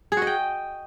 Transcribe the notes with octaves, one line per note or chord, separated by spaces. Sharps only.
G#4
F#4
D#5
G5